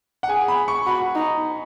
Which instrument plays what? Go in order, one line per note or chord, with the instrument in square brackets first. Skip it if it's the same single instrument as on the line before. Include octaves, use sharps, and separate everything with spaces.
[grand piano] F#5
[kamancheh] G#4 [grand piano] G#5
[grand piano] B5
C#6
[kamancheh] F#4 [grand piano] B5
[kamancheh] D#4